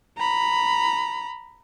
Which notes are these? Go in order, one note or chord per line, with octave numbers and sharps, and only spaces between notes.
A#5 B5